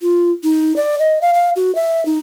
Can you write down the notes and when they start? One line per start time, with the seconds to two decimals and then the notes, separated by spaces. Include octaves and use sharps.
0.01 F4
0.44 D#4
0.76 D5
0.99 D#5
1.22 F5
1.34 F5
1.56 F#4
1.75 E5
2.06 D#4